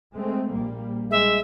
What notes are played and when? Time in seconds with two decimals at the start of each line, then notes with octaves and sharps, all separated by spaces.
0.13 G#3 A3 C4
0.50 A#1 G3 A#3
1.11 G#3 E5